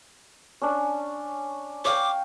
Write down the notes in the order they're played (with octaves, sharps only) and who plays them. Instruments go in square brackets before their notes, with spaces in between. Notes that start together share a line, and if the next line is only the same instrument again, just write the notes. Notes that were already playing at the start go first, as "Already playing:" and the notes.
[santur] C#4 D4
[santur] C#5 F5 G5 [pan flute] D6